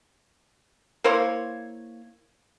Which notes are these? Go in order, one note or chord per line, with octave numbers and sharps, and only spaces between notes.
A#3 E4 C5 C#5